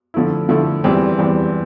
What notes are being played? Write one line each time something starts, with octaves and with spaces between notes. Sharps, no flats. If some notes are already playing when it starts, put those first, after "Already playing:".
D3 F3 A3 E4
D3 F3 A3 E4
E2 E3 G3 C4 G4
E2 E3 G3 C4 G4